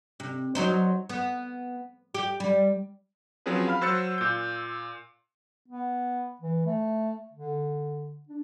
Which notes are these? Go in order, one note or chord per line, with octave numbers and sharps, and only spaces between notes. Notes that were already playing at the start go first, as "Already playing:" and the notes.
C3
F#3 D#4 C5
B3
G4
G3
F3 F#3 C4 C#4 G#4 B4
F5 B5 F6
F#3 C5 E6 F#6 A6 C#7
A#2 G6
B3
E3
A3
D3
D4